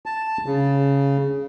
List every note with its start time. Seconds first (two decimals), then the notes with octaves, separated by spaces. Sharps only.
0.06 A5
0.46 C#3